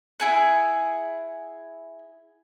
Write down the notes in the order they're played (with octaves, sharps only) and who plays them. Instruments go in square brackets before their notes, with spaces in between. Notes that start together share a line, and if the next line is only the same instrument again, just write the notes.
[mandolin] E4 G#4 F#5